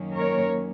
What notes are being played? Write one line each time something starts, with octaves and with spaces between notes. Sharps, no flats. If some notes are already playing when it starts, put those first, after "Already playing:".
Already playing: F#2 D#3 F#3 A#3 C#4
A#4 C#5